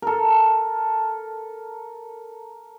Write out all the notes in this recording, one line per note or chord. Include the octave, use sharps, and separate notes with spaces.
A4 A#4